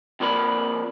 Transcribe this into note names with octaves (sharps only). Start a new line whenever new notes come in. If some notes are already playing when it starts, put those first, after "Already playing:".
F2 F3 A#3 D5 B5